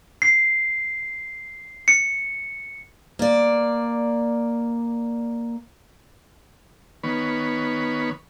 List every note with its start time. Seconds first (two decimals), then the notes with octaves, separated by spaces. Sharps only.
0.22 C7
1.88 C#7
3.19 A#3 D5
7.04 D#3 B3 C#5 B5